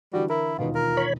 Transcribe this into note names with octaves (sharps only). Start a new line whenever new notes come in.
D3 E3 G3 F#4
E4 A#4
E1 D#2 B2 D#4 F4
F4 A#4
C#5 B5